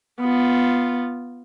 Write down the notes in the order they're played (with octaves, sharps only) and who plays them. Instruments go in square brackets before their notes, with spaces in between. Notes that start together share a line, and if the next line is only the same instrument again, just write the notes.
[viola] B3 F4